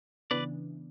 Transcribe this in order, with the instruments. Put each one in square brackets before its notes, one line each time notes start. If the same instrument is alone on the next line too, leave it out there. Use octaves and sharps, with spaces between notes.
[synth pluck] C#3 E3 B3 D4 [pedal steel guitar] B4 D5